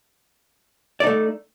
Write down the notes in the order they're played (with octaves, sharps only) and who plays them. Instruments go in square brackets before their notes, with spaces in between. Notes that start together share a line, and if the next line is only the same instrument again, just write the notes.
[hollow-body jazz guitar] D5
D#4
A3